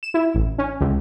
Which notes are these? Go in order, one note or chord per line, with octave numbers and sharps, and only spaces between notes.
E7
E4
A1
C#4
C#2